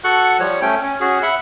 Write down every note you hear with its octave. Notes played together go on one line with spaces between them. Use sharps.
F#4 A4 F#5 C#6 F#6
F3 G3 C#5
A3 C#4 G5
C#4
C#4 F#4 G#4
E5 F#5 B5